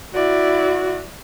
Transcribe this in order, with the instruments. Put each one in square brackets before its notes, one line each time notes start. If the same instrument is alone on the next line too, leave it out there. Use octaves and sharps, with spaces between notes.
[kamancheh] E4 D5 [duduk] F#4